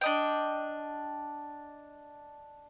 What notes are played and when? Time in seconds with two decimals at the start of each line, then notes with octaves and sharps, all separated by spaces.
0.01 D4 D#5 G5